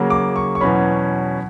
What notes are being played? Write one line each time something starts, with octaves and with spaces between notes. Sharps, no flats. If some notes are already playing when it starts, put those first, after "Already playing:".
Already playing: C#3 F#3 A#3
D6
C#6
C#6
E2 B2 F#3 C#4 B5